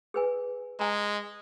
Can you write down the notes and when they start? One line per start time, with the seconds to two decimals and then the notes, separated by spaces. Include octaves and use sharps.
0.14 G#4 B4 G#5
0.80 G#3 G#5 A#5